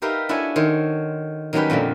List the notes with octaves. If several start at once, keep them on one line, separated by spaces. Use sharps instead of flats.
D#4 G4 A#4 B4 E5 F5
D4 E4 F#4 A4 C#5 G#5
D#3 C5 C#5
D#3 F#3 G3 C#4 G4 B4
F2 A#2 D3 F3